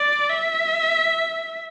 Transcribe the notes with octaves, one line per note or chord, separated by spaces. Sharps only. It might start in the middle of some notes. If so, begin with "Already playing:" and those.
Already playing: D5
E5